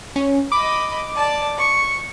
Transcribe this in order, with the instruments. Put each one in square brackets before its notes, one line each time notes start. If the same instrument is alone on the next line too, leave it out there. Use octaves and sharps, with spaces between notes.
[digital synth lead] C#4
[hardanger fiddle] D#5 B5 [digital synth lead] D6
[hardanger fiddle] D5 A5
C#6